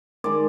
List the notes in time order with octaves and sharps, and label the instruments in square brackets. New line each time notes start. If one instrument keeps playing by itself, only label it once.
[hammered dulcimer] D#3 G#3 D5